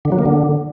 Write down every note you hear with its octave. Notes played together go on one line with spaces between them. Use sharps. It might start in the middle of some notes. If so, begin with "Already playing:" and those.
D3
F#3
A#3
D3